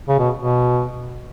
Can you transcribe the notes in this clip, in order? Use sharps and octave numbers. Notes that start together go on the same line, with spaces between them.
C#3
B2
B2